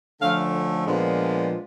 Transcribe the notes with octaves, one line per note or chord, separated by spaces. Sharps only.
D3 F3 A3 C#4 F5
A#2 F3 G#3 B3 D4